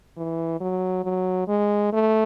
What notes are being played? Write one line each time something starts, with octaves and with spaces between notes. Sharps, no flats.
E3
F#3
F#3
G#3
A3